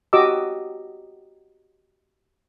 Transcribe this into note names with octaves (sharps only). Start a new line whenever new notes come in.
F#4 G4 D#5 D6 E6